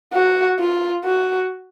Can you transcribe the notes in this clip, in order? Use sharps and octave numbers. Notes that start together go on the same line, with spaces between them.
F#4
F4
F#4